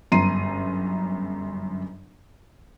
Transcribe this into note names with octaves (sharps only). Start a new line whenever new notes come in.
G1 F#2 A#5 C6 C7 D#7